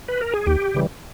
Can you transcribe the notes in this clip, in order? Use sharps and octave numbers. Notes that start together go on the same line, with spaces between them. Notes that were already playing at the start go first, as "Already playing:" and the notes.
B4
A#4
G#4
D#2 G4
C#3 E3 G3